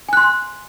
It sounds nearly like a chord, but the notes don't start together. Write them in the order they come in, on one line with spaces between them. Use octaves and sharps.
G#5 F#6 C6